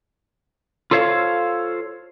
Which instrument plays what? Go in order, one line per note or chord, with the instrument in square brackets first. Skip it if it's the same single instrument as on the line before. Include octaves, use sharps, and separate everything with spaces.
[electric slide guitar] F4 A4 C5 C#5 F5